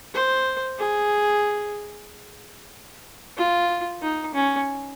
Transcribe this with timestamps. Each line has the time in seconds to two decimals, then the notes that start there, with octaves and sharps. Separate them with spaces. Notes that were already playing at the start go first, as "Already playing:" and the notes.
0.14 C5
0.79 G#4
3.37 F4
4.02 D#4
4.34 C#4